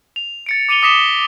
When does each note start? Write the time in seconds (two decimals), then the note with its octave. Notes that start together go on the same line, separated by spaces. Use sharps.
0.16 F7
0.46 A6 C#7 D7
0.69 D6 C#7 D#7 F7 G7
0.82 D6 D#6 A#6 B6 E7 G7